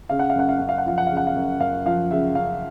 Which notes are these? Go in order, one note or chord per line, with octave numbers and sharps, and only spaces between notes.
C#3 F5
F#5
F5
F#2 F#5
F5
F#2 F#5
F5
F#5
F3 F5
F#5
C#3 F5
F#5
F5
F#2
F#2 F5
F3 F5
C#3 E5
F#2 F5